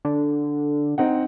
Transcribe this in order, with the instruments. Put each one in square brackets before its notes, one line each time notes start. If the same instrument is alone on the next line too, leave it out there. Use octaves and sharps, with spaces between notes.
[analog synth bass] D3
[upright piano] C4 D#4 F#5